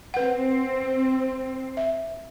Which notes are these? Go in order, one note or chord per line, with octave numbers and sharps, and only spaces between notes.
C4 B4 F#5
E5